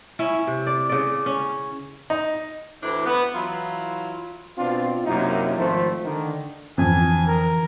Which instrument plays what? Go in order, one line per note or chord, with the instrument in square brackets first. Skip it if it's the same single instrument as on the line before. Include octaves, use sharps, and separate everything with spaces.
[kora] C#4 E4
C3
D5
C#3 D5
C#4
[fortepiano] D#4
[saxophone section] D2 A2 E3 D4 E4 C5
B3
E3 F#3 E4 F4
[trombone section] B2 C4 D4 F4
F#2 C3 A#3 D#4 E4
G#1 F3 A3 C5
D3 D#3
[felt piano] F2 [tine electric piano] D3 E3 [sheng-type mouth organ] G#5
[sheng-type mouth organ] A#4